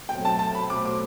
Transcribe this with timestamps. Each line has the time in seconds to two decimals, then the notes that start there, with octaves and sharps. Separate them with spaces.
0.09 B2 F#3 A3 C4 G5
0.25 A5
0.39 A5
0.55 B5
0.70 B2 F#3 A3 C4 D6
0.85 D6